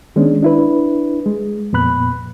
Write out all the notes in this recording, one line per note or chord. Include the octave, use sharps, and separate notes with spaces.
D#3 G#3 B3 C#4 D4
D4 E4 B4
G#3
F2 A#2 B3 B5 F#6